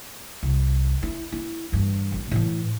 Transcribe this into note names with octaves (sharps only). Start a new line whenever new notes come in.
C2
E4
E4
G2 E3
A1
A2 E3